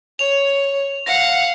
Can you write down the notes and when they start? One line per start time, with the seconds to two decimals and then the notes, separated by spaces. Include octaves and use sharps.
0.19 C#5 F7
1.06 F5 F#5 A#6 C#7